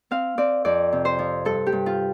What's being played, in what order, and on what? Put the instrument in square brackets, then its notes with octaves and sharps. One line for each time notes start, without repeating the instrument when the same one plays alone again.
[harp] C4 F5
C4 D5
F2 D5
C3
C5
F3
G2 A4
G4
G2
F4